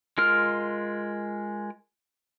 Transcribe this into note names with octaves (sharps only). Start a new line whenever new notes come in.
G#3 F4 A#4 F6